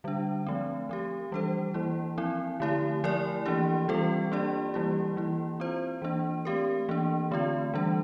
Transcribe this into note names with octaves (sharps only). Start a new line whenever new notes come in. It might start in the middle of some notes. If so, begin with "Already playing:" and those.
D3 G3 D4
F3 A3 C4
F3 C4 G4
E3 G3 D4 A4 C5
E3 A#3 E4
F3 C4 E4
D3 A3 E4 G4
F3 A3 E4 A#4 D5
E3 A#3 D4 G4
E3 G3 C4 F4 A4
A#3 D4 G4 D5
E3 G3 A#3 E4 G4
E3 A#3 E4
C4 F4 C5
E3 A#3 D4
A3 C4 G4 A#4
E3 A#3 D4
D3 A3 C4 F4
E3 G3 D4